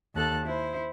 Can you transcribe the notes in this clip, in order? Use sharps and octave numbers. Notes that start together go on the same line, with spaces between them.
D#2 A4 A5 F#6
E4 C5